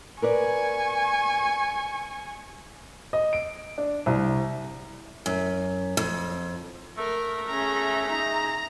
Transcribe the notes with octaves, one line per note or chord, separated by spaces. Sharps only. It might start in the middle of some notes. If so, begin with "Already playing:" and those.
A#4 B4 D5 G#5 C#6
D#5
D7
D4
C2
F#2
F2
A3 A#4
C#4 G#4 E5 A#5
D#4 A#5